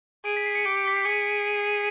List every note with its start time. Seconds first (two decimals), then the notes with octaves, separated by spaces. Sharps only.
0.24 G#4 D7
0.37 B6
0.46 C7
0.55 C#7
0.65 G4 D7
0.88 B6
0.96 C7
1.05 G#4 C#7